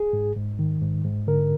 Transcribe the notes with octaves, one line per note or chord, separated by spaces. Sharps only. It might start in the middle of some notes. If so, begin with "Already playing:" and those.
Already playing: G#4
G#2
G#2
D#3
G#2
G#2
D3 A#4